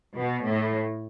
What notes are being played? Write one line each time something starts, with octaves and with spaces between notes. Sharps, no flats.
B2
A2